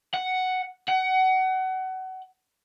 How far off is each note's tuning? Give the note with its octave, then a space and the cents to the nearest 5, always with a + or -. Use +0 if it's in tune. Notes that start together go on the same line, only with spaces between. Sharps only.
F#5 +5
F#5 +25